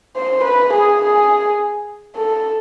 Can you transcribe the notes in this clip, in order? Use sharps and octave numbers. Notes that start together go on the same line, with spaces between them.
C5
B4
G#4
G#4
A4